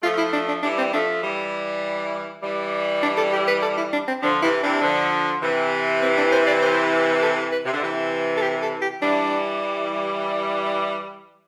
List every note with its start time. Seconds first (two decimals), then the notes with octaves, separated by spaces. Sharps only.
0.03 F3 A3 F4
0.18 E4
0.33 D4
0.48 D4
0.63 E3 G3 D4
0.78 C4
0.93 F3 A3 D4
1.22 E3 G3
2.42 E3 G3
3.03 D4
3.17 A4
3.32 G4
3.47 B4
3.62 A4
3.77 E4
3.93 D4
4.08 C4
4.22 D3 F3 D4
4.42 C3 E3 E4
4.62 C3 E3 D4
4.82 D3 F3
5.42 C3 E3
6.02 C4
6.17 D4
6.32 C5
6.47 D5
6.62 C5
7.22 A4
7.52 B4
7.65 C3
7.73 D3
7.82 C3 E3
8.37 A4
8.42 G4
8.62 A4
8.82 G4
9.01 E3 G3 D4